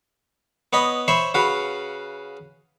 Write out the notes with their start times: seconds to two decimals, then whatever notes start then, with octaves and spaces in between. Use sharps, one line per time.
0.73 B3 C#5 D#5 B5
1.08 C5 C#5 E5 B5 C#6
1.34 C#3 F#4 B4 F5